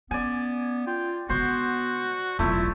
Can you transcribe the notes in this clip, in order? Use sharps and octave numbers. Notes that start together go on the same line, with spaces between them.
B3 C#4 D5 G#5
F4 G5
D3 G#3 B3 F#4 C5
E1 B1 A3 E4 F4